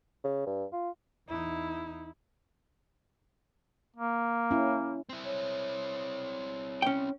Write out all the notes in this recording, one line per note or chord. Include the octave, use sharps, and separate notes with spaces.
C#3
G2
F4
E2 D#4 E4
A#3
C#4 E4
C4 E4
C#5
C#4 G5